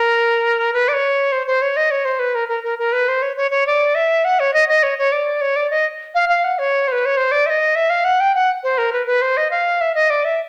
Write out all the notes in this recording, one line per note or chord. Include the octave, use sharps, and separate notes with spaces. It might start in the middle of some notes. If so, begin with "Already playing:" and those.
Already playing: A#4
B4
D5
C#5
C5
C5
C#5
D#5
C#5
C5
B4
A#4
A#4
A#4
A#4
B4
C5
C#5
C#5
C#5
D5
E5
F#5
C#5
D#5
D#5
C#5
C#5
D5
C#5
D5
D#5
F5
F5
F#5
C#5
C5
B4
C#5
C5
D5
E5
D#5
E5
F5
F#5
G5
F#5
C5
A#4
B4
B4
C5
D#5
F5
E5
D#5
D5
E5